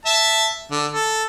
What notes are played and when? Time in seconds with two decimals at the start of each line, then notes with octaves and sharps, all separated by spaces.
0.06 E5 A5
0.71 D3
0.93 A4